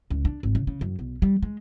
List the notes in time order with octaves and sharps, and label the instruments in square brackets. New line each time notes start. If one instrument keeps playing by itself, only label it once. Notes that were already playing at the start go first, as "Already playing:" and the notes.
[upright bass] C#2
D4
G#1
C#3
C#3
F#2
B1
G3
G#3